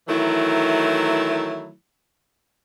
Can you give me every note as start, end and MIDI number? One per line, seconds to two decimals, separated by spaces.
0.08 1.72 51
0.08 1.72 52
0.08 1.72 54
0.08 1.72 57
0.08 1.72 64